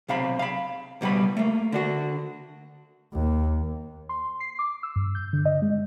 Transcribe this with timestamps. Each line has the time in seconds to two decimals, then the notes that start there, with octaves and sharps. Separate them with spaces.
0.09 B1 C3 F5 B5
0.39 F5 B5
1.01 C#2 B2 G3 B3 B5
1.37 A3 A#3
1.72 D3 D4 F#4
3.14 D#2
4.09 C6
4.40 C7
4.59 D6
4.83 E6
4.96 G2
5.15 G6
5.33 D3
5.45 D#5
5.62 G#3